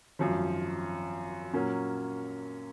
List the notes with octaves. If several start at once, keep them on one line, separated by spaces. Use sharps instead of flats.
G#1 F#2 F3
A#2 F#3 A#3 C#4